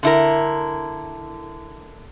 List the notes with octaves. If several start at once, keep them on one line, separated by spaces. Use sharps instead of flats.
D3 E4 A#4